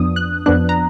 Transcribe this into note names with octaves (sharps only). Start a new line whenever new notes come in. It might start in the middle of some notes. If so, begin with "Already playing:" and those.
Already playing: F2 F3 B3 D4 D#6
F#6
F2 F3 B3 D4 F#6
A#5